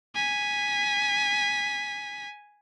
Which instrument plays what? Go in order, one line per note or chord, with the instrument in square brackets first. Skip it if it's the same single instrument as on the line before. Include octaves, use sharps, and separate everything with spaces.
[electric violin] G#5 B6